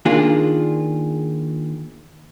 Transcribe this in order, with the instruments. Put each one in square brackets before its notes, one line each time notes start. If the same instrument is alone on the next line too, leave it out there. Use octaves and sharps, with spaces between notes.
[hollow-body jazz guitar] D#3 A#3 D4 F4 G#4